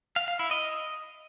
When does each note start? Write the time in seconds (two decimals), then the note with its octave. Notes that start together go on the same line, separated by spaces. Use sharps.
0.16 F5
0.28 F5
0.39 E4
0.51 D#5